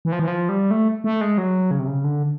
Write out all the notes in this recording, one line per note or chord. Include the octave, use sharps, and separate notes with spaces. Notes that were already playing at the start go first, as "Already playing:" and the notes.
E3
F3
E3
F3
G3
A3
A3
G#3
F#3
C#3
C3
C#3
D3